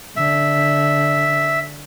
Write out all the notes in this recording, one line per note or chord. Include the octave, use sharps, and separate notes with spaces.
D3 E5